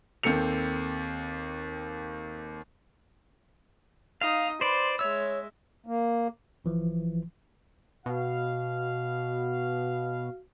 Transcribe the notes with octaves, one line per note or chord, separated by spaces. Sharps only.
D#2 C4 A4 C#7 F7
D#4 F5 D#6
B4 C5 D5 C6
G#3 C#5 E5 E6
A#3
G1 E3 F3
B2 F#4 F5